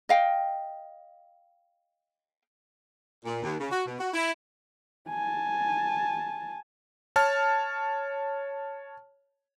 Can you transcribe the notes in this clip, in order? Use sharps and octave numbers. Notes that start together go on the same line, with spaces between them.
D#5 F5 G5
A#2
D#2
C#3
F#4
B2
F#4
E4
G#5 A5
C#5 A5 F6